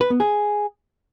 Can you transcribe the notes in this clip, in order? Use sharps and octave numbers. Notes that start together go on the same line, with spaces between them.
B4
B3
G#4